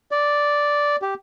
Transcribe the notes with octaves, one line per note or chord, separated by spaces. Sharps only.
D5
G4